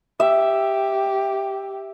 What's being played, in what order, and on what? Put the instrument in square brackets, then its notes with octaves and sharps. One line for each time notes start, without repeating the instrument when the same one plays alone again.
[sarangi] G4 [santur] E5